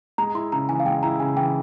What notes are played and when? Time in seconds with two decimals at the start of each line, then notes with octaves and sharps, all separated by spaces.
0.18 G#3 A#5
0.35 E4 C6
0.52 C#3 A#5
0.69 E3 G#5
0.80 F5
0.85 G#3 G5
1.03 E4 A#5
1.20 C#3 G#5
1.36 E3 G5